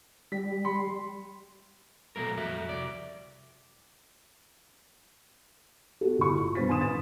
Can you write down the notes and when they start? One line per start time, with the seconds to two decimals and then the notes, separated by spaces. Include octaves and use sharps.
0.32 G3 B6
0.65 B5 C6 C#7
2.16 B2 F#3 A3 A#4
2.37 F2 F#4 E5
2.69 C2 D5
6.01 B3 F#4 G4 A4
6.18 G1 A2 E4 C#6
6.38 A#2
6.55 G2 B2 B4 C5 A6 B6
6.67 D#3 B3 G#5 C6 D#6 E7
6.81 A1 B4 A6 E7